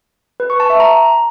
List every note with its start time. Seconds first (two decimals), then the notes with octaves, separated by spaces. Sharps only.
0.40 B4
0.50 C#6
0.60 A5
0.70 E5
0.80 A#5